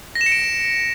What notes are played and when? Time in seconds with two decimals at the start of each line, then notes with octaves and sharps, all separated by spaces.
0.15 A#6
0.21 E7
0.26 C#7
0.32 D7